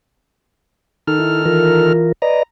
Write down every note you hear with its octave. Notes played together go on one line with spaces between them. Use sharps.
D#3 D#4 A4 F6
E4
E3 F4 A#4
B4 D5 D#5 A#5